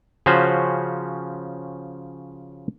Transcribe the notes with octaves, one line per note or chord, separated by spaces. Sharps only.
C#3 F3 C#4 F#4 C5